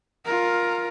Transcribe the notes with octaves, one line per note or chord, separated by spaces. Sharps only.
F4 A#4